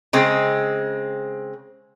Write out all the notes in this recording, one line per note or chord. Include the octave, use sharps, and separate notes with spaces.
C#3 G#3 C4